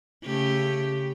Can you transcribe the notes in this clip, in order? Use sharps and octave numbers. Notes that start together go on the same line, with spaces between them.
C#3 A3 G4